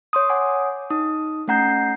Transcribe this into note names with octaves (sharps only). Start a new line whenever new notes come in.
C#5 C6 D#6
C#5 F#5 G#5 D6 D#6
D#4 D#6
A3 C#4 F#5 A#5 G6 C7